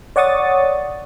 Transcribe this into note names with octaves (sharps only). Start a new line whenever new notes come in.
C#5 D5 F#5 C#6 D#6 A6